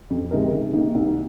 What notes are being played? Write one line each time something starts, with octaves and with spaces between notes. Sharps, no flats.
F2
C3 G#3 D#4 A#4
C3
D#3 A#3 D#4
C2